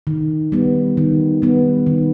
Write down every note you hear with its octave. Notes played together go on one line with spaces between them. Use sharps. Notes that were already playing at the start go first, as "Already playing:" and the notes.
D#3
G3 B3
D#3
G3 B3
D#3